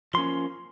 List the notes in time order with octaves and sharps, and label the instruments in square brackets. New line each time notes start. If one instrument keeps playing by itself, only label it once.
[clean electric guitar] F3 A#3 C#4 C6